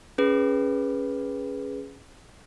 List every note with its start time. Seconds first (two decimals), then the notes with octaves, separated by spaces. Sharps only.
0.18 C#4 G#4 B4